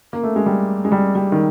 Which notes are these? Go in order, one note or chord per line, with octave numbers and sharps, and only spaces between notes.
A#3
A3
G#3
G3
G#3
G3
G3
D#3